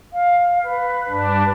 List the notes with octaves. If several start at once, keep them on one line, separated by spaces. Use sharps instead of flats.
F5
B4
G2 D4